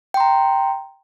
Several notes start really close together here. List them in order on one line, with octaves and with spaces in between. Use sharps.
G5 C6 A#5